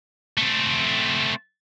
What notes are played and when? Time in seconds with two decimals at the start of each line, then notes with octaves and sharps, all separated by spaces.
0.37 A3 C4